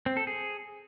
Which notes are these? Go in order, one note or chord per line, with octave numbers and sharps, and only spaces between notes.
C4
A4
G#4